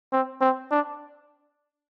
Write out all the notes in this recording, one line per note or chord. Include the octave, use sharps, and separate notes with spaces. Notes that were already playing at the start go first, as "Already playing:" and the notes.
C4
C4
D4